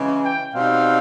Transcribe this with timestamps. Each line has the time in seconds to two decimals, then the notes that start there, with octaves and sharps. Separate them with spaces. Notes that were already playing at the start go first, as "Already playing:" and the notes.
Already playing: C#3 E3 G#3
0.23 G5
0.53 B2 G3 C4 D#4 F5